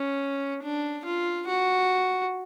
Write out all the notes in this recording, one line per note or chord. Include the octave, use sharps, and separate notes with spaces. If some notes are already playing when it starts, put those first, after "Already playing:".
Already playing: C#4
D4
F4
F#4